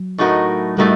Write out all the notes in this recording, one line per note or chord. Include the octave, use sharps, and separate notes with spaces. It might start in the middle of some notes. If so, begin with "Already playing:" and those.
Already playing: F#3
A2 A3 D#4 F#4 A#4
A2 G3 A3 D#4 F#4 A#4